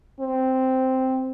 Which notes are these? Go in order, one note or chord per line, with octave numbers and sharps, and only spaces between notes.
C4